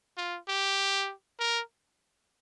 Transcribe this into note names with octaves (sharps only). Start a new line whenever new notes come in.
F4
G4
A#4